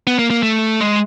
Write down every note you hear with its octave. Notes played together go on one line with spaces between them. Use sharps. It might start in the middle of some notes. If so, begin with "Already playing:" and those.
B3
A#3
A#3
A3
G#3